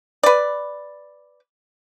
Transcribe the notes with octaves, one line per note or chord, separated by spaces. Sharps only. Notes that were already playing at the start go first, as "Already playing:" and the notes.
B4 D5